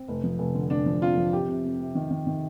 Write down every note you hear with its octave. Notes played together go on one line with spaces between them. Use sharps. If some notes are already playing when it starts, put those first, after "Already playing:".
Already playing: C4
F1
F3
F1
D3
F1 D4
F3
F2 F4
F3
C3 G4
C3
F2
C3
D#3
D#3
D#3